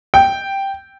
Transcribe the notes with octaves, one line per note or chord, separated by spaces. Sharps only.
G5